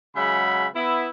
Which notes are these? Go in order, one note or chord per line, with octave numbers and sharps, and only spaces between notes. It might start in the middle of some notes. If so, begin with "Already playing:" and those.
C#3 F#3 G#3 E5 F#5 B5
B3 E4